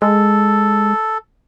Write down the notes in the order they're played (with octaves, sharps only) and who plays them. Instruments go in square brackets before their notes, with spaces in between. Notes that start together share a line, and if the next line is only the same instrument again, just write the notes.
[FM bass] G#3 [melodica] A4